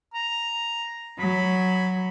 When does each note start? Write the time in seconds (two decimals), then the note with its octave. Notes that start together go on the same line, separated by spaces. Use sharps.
0.14 A#5
1.19 F#3 B5